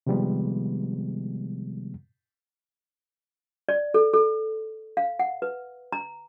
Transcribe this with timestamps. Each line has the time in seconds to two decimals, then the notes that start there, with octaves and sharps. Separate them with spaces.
0.07 C3 D#3 F3 G3 G#3 B3
3.69 D5
3.94 A4
4.13 A4
4.97 F5
5.19 F#5
5.42 B4
5.92 A#5